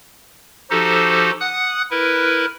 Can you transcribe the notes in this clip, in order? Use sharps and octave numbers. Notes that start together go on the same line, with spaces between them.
F3 D#4 F#4 G4 A4 C5
F#5 D#6 F#6
E4 A#4 B4